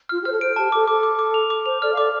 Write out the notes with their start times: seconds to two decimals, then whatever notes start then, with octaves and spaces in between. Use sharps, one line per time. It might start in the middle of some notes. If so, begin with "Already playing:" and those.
0.09 F4 F6
0.20 G4
0.25 C5 F6
0.30 A4
0.41 C5 D7
0.56 G4 A5
0.72 A4 D6
0.87 A4 D6
1.03 D6
1.19 D6
1.34 F7
1.50 D6
1.66 C5 F7
1.81 A4 D5 F6
1.93 F5
1.97 A4 D5 D6